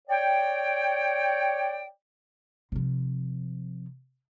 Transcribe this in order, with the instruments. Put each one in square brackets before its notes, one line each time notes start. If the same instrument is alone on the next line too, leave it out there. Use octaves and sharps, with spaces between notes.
[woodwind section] C#5 D5 G5
[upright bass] C3 F3